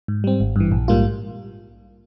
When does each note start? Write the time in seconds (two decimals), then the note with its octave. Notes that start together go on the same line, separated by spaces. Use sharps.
0.08 G#2
0.24 G3 C4
0.40 G#1
0.56 G2 E3
0.72 A#1
0.88 G#2 G3 A#3 F4